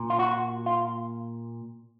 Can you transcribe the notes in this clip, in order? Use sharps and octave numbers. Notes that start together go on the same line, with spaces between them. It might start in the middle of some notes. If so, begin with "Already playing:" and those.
Already playing: A#2
F4
F#4
F4